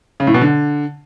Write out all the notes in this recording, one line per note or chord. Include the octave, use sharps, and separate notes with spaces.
C#3
A2
B2
D3